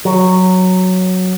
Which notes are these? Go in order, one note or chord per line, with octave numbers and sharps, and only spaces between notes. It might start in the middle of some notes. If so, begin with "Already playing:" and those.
F#3